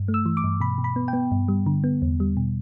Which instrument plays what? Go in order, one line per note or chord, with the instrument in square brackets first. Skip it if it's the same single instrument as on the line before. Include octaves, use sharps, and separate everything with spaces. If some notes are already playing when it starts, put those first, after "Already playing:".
Already playing: [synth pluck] G2
A3
E6
E3
D6
G2
B2 B5
B2
B5
B3
G5
B3
G2
G3
D3
B3
E2
G3
B2